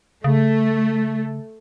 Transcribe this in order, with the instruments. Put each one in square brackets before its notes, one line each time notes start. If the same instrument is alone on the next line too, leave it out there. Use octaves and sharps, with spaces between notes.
[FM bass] C#3 [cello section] A3